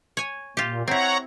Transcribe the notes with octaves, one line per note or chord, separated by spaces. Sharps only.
C#5 G#5
A#2 F4 G4
C4 E4 C#5 F#5 A#5